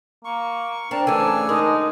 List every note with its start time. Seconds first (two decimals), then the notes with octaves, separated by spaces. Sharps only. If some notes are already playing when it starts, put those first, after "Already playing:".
0.25 A#3 C#6
0.91 C4 D4 A#4 A5
1.07 C#3 E3 A3 D4 A4 G#5
1.49 G#3 D#4 A#4